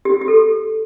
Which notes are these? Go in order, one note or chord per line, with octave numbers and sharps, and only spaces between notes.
G4
G4
A4